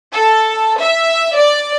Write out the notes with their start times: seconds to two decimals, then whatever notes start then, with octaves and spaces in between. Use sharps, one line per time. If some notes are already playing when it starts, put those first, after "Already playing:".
0.13 A4
0.80 E5
1.36 D5